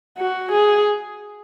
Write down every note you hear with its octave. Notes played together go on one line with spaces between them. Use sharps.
F#4
G#4